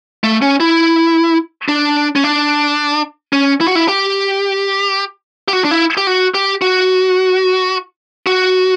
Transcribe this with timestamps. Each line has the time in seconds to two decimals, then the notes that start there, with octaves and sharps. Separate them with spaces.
0.24 A3
0.42 C#4
0.60 E4
1.69 D4
2.16 C#4
2.24 D4
3.33 C#4
3.61 E4
3.68 F#4
3.75 E4
3.88 G4
5.48 G4
5.53 F#4
5.64 D4
5.71 E4
5.97 G4
6.07 F#4
6.34 G4
6.62 F#4
8.27 F#4